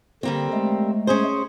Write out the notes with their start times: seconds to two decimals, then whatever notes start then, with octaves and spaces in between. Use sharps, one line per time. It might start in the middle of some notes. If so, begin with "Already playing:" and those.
0.23 D3 G3 A#3 C4
0.53 G#3 A3
1.07 C#4 G#4 C5